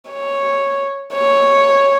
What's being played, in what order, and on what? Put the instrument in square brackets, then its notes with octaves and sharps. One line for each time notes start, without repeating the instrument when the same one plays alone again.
[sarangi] C#5
C#5